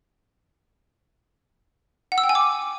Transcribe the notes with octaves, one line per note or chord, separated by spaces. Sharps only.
F#5
E6
G5
G#5
D6